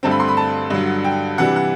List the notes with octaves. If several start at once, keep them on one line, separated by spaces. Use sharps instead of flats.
G2 D3 A3 C4 A5
B5
C6
B5
A5
G2 D3 F#3
G5
C3 E3 G3 D4 F#5
F#5